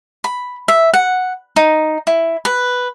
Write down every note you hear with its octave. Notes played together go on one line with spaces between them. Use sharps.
B5
E5
F#5
D#4
E4
B4